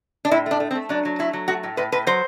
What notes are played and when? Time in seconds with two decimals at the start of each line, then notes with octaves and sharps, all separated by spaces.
0.25 D4
0.31 A2 E4
0.46 A3 D4
0.60 A3
0.71 C4
0.75 A3
0.89 F#3 D4
1.05 F#3
1.19 A3 E4
1.33 F#3
1.48 A3 F#4
1.63 A2
1.77 A2 B4
1.92 A2 B4
2.07 F#3 C5